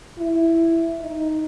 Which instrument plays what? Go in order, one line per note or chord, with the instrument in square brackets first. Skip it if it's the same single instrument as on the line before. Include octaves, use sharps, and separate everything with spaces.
[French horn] E4
D#4